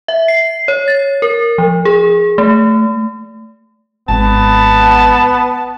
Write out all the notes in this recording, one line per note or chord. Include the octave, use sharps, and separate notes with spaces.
E5
C7
C#5
A6
A#4
F3
G#4
A3
G#1 B3 A5